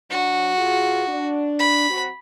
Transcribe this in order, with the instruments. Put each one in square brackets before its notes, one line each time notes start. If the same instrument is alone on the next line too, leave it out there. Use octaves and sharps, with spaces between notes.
[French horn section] F#3 D4 [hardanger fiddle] F#4
[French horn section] B2 F4 G#4
D4
[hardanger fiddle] B5
[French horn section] F#3 C4 F#4